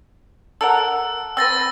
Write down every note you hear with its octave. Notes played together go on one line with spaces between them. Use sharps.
A4 A#4 F#5 E6
C4 B4 E6 A6 A#6